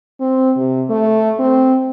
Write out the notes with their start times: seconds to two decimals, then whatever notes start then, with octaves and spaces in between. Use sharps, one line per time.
0.20 C4
0.57 C3
0.90 A3
1.39 C4